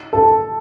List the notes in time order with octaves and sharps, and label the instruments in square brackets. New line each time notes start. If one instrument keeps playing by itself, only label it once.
[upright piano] A4